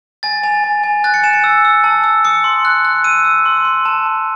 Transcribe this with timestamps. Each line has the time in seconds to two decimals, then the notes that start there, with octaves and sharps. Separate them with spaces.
0.23 G#5 A6
0.43 G#5
0.64 G#5
0.83 G#5
1.04 F#6 A6
1.14 C#7
1.23 G#5 E7
1.33 C#7
1.44 E6
1.65 E6
1.84 A5
2.04 E6
2.25 D#6 C#7
2.44 C6
2.65 F#6
2.85 F#6
3.04 E6 D#7
3.25 E6
3.46 C6
3.65 C6
3.85 A5 E7
4.06 A5